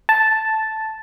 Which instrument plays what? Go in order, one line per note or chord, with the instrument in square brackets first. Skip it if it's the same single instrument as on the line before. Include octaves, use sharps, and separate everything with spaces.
[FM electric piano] A5